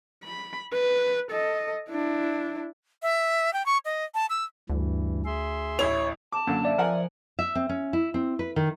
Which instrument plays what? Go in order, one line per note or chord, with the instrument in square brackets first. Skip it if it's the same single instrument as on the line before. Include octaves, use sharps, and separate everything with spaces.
[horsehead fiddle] B5
B4
A4 D#5
D4 E4
[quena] E5
G5
C#6
D#5
A5
E6
[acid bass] D2 [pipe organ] G2 E3
[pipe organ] G#4 E5 C6
[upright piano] A1 E4 F7 [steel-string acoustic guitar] C#5
[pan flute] A5 [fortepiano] D6
[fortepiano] F#2 D3 [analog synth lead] A#3
[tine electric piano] D5 E5
[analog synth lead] F3 [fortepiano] A#4 F#5 G#5
[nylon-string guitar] E5
C4
C#4
E4
C4
B4
D#3